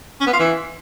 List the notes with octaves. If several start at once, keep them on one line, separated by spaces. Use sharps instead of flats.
C#4
B3
F4
E3